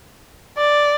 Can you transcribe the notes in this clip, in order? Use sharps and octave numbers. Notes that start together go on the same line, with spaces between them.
D5